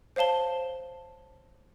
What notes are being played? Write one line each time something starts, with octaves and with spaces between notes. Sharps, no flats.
C5 C#5 F5 A5 G7